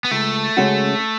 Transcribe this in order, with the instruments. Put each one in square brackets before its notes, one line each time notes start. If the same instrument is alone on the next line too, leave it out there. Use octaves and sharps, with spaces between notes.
[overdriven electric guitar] B3
[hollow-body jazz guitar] C#2 [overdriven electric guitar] A3
[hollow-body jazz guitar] C#3 G#3 C#4 F#4